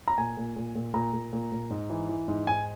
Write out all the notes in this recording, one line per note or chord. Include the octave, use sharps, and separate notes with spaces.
A#5
A#2 G#5
A#2
A#2
A#2
A#2 A#5
A#2
A#2
A#2
G#2
E3
E3
G#2
G#2 G#5